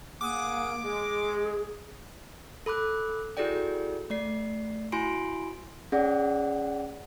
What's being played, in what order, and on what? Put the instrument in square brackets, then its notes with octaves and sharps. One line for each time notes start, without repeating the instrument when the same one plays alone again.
[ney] A#3 [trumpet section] G#4 F#5 D#6 [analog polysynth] D6
[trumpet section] G#3 [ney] G#4
[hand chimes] A4 B5 D6 F#6
E4 F#4 G#4 A4 D5 G5
A3 D5 C7
E4 F#4 G#5 B5 C6 D7
C#4 G#4 D5 F#5